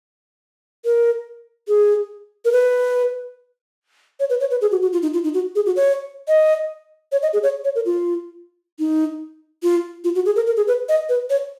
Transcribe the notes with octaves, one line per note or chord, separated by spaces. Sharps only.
A#4
G#4
A#4
B4
C#5
B4
C#5
B4
G#4
F#4
F#4
F4
D#4
F4
D#4
F#4
G#4
F#4
C#5
D#5
C#5
D#5
G#4
C#5
C#5
A#4
F4
D#4
F4
F4
F#4
G#4
A#4
A#4
G#4
B4
D#5
B4
C#5